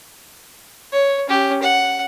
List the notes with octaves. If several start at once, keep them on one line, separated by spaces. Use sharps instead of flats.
C#5
C#4 G4
F#5